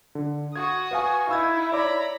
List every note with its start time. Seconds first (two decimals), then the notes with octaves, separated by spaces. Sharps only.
0.15 D3
0.56 F#4 C#6 D#6 G#6
0.91 B4 F5 G#5
1.29 D#4 E4 F5 E6 G#6
1.72 C#5 D5 A#5 B5 D6